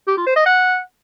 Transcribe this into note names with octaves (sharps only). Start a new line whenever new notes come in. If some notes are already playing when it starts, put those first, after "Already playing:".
G4
F4
C5
D#5
F#5